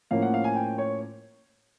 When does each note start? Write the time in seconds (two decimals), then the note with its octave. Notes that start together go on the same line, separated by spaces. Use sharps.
0.11 A2 F3 A#3 C#4 F5
0.22 F#5
0.34 F5
0.44 G#5
0.55 G5
0.78 C#5